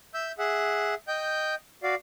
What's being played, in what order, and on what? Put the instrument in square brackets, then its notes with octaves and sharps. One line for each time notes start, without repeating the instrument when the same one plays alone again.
[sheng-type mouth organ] E5 E6 G6
G#4 E5 F#5
D#5 G5 G6
F#4 D5 F5